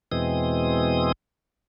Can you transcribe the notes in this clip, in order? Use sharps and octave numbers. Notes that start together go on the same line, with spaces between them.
E2 B2 E3 G#3 C4 D#6